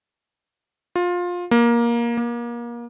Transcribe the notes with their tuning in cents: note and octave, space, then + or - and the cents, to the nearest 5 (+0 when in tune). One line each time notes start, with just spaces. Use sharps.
F4 +20
A#3 +15
A#3 +30